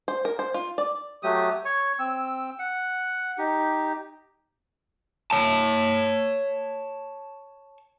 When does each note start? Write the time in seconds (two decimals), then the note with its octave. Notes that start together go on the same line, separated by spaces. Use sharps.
0.08 C5
0.25 A#4
0.39 C5
0.54 F4
0.78 D5
1.23 F#3 A3 G4 D#6
1.65 C#5 C#6
1.99 C4 E6
2.59 F#5
3.38 D#4 G4
5.31 C#5 A5